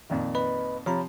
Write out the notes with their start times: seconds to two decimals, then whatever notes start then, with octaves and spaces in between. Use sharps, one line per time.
0.10 F2 A#2 D#3
0.35 B4 D#5 B5
0.86 C3 F3 C#5 A#5 B5